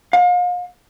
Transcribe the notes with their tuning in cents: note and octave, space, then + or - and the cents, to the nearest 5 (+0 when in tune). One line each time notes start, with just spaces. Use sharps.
F5 +40